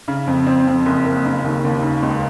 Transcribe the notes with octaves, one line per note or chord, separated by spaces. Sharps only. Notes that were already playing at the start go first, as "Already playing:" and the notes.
C#3
F2
C4
F2
F#1
A#3
C#3
D#2
D#2
C#3
C#2